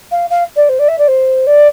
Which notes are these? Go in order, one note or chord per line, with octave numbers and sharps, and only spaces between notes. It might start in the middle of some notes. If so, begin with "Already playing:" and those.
F5
F5
D5
C5
D5
E5
D5
C5
D5